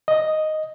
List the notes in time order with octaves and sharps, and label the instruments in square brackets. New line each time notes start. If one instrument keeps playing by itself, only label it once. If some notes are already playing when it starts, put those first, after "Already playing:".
[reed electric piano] D#5